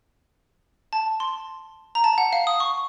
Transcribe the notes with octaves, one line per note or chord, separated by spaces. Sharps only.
A5
C6
A#5
A5
F#5
F5
D#6
C#6